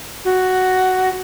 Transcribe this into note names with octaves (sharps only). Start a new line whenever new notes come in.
F#4